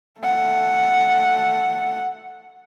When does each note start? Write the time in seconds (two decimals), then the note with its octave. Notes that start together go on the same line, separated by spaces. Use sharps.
0.21 A3 F#5